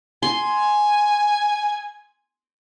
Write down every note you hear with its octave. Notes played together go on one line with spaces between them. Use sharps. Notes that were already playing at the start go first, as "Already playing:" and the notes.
G#5 C6